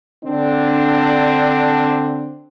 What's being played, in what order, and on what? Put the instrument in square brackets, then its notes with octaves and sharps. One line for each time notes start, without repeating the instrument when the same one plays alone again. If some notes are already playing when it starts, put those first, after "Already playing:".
[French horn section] D3 C4 D4